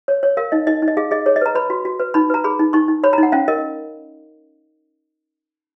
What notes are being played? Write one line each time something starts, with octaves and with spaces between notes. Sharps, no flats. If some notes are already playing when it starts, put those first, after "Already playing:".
C#5
C#5
A#4 F5
D#4 D#5
D#4 D#5
D#4
D#5
G#4 F5
G#4 D#5
G#4 C#5
D#5
B4 A#5
B4 B5
F#4
F#4
B4
D#4 B5
B4 A#5
G#4 B5
D#4
D#4 C#6
D#4
C#5 B5
A#5
D#4 F#5
C#4 F5
A#4 D#5